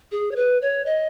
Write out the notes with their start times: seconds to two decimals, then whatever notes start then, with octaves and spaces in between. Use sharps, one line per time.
0.12 G#4
0.32 C#5
0.36 B4
0.62 C#5
0.86 D#5